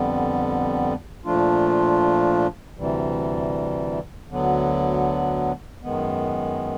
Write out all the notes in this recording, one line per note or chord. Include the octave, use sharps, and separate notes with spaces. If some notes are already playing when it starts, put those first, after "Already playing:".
Already playing: F2 D3 G3 B3
A#2 F3 A3 D4 F4
D2 C3 E3 G3
D2 D3 F#3 B3
F#2 D#3 G#3 B3